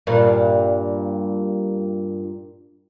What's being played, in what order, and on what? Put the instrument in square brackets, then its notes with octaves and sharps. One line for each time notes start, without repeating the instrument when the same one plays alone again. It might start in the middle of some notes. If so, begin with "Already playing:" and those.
[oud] G2 A#2